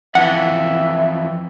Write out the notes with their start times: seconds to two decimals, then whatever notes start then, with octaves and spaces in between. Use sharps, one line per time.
0.15 F2 E3 E5 F#5